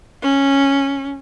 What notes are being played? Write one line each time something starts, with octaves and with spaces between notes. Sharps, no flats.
C#4